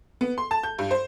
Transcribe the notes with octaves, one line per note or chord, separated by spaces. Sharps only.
B3
C6
A5
G6
G2
C5